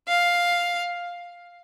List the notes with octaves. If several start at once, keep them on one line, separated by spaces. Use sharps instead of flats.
F5